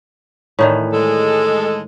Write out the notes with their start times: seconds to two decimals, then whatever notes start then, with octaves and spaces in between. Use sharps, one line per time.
0.59 A2 D#3 E3 C#5 D5
0.93 G#3 A4